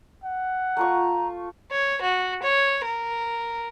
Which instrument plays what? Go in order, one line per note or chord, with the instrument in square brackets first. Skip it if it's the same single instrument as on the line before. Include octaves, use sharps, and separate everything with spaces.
[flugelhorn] F#5
[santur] A3 F4 C#6 [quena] A#5
[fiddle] C#5
F#4
C#5
A#4